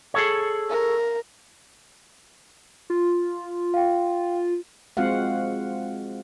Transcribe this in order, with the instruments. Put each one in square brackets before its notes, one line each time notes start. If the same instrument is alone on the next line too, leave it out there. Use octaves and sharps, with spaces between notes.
[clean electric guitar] G#4 A4 C#5
[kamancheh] A#4
[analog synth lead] F4
[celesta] F5 G5
[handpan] G#3 C4 F4 F#4 F5 F#5